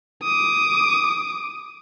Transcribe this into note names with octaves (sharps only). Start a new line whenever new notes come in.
D6 D#6